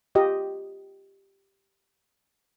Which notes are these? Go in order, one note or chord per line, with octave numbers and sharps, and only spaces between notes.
F4 G4 D#5